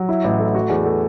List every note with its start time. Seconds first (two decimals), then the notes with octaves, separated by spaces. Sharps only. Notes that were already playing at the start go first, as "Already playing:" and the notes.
Already playing: F#3
0.09 E4
0.24 A1
0.39 A3
0.55 F#4
0.70 E2
0.85 A3